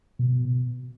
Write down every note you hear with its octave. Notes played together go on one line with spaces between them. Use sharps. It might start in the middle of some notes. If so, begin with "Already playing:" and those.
B2